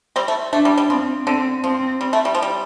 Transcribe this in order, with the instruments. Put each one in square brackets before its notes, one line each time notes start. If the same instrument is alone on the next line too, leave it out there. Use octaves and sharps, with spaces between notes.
[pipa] G3 C4
A3
[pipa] A3 [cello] D4
[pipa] G3
G3
[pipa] F3 [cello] C4
[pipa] D3 [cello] C4
[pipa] F3 [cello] C4
[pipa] G3
A3
G3
F3
G3